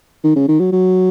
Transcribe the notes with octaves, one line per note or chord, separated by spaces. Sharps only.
D#3
C#3
D#3
F#3
F#3